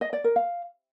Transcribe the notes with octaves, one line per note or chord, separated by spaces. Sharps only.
D#5
D5
A#4
F5